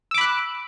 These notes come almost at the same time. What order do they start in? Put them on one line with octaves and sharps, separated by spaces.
E6 D6 B5 F#6